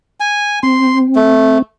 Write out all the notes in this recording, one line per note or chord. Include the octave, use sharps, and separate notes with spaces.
G#5
C4 C6
A3